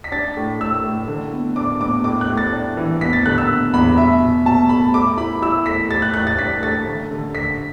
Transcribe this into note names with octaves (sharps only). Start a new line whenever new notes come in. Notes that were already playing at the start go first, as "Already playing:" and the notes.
B6
D4 A6
A2
A2 E6
A2
D3
B3
D4 D6
B3 D6
A2 D6
F#6
A2
A6
D4
E3
B3 B6
A6
D3 F#6
E6
B3
E2 B5
B2 E5
B2
B2 A5
A3 B5
A3 D6
E4 B5
E4 E6
A3 B6
A3 A6
F#6
A2 F#6
A6
D4 B6
A3 A6
D3
D3
D3 B6